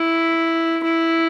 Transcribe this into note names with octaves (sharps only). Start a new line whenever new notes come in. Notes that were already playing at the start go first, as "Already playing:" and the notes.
Already playing: E4
E4